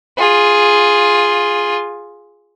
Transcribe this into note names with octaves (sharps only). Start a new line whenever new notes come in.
F4 G#4